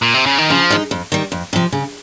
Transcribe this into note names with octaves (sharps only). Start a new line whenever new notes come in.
A#2
C3
C#3
D#3
C#3 F3
G#3 D#4
F2
D#3 G3
F2
C3 F3
C#3